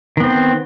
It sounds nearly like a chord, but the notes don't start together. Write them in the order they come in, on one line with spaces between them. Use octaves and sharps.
D#3 B3 C4